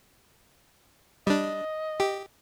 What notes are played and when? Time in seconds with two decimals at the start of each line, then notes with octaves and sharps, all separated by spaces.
1.27 G3 D4 D#5
2.00 G4